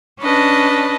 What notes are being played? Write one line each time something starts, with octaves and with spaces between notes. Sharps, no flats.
C#4 D4 B4 D#5 A5